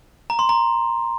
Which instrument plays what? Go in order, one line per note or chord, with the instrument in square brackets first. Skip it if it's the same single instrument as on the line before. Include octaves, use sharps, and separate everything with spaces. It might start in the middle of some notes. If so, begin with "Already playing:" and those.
[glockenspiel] A#5
C6
A#5